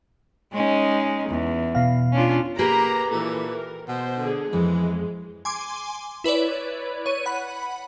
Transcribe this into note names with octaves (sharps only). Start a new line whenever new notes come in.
G#3 C#4 D#4
E2
B2 F5
C#4 D4 F4
A#3 G4 G#4 B4 A#5
A#2 E3 A4
A#4
B2 C5
D3 G#4
F2 E3 G#3
G#5 C6 D6
E4 B4 C#5 D5
C#5 D#7
F#5 B5